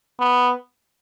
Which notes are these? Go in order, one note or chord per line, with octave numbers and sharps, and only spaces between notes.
B3